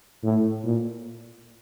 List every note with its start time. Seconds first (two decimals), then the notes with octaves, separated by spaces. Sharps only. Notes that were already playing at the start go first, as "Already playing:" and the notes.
0.24 A2
0.64 A#2